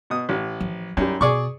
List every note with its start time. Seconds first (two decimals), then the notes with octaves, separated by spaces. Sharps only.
0.10 B2 D#6
0.29 A1
0.60 F3
0.97 F#2 G3 D#4 E4
1.21 B2 G#4 D5 C#6